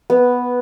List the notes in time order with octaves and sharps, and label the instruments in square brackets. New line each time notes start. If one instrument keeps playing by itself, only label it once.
[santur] B3